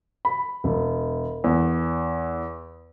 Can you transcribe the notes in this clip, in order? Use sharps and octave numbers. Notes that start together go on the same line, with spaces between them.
B5
E1
E2